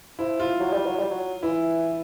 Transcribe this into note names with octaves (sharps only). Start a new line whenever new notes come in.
F3 E4
F4
F#3
G3
F#3
G3
F#3
E3 E4